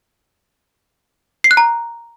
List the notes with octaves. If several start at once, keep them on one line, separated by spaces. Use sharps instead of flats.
C7
F#6
A#5